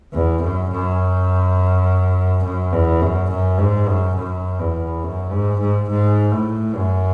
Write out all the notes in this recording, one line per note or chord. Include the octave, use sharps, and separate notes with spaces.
E2
F#2
F#2
F#2
E2
F#2
F#2
G#2
F#2
F#2
E2
F#2
G#2
G#2
G#2
A2
F#2